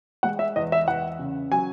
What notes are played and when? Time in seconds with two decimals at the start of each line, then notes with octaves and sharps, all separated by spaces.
0.23 G#3 F#5
0.39 E5
0.56 E2 D#5
0.72 E5
0.88 E2 F#5
1.19 C#3
1.52 F#3 G#5